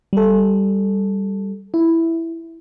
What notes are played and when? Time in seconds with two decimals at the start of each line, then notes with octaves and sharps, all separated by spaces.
0.13 G3 A4
1.74 E4